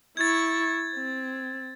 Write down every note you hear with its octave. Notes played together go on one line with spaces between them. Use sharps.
E4 C#6 G#6 A6
C4